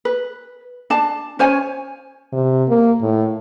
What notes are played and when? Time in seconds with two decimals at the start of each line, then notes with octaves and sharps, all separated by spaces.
0.05 B4
0.90 D4 A5
1.39 C#4 C5 C#5 G#5
2.33 C3
2.69 A#3
3.01 A2